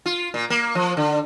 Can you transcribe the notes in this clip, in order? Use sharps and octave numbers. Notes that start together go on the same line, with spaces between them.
F4
A#2
A#3
F3
D3